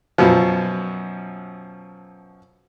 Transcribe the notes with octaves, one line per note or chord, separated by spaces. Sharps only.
F#2 B2 F3